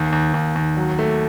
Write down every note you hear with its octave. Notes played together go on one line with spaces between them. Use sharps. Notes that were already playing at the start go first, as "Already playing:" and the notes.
Already playing: D#2
D#2
D#2
D#2
F#3
A3